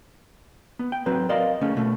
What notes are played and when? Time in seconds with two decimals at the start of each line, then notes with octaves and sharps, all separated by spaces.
0.79 B3
0.92 G5
1.06 F#3 C4 B4
1.29 A#4 D5 D#5 F5 C6
1.61 C#3 A3 C#4
1.77 B2 A3